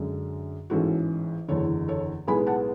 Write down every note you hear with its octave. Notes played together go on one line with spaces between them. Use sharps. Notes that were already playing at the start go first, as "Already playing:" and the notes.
Already playing: F#2 D3 G#3
A1 G#2 E3 G#3 C#4 F#4 A4
F#1 E2 D3 A4 C#5
A4 C#5
B1 A2 G#3 B3 G#5 B5
F#5 A5